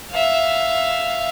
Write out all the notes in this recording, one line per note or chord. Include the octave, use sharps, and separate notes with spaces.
E5 F5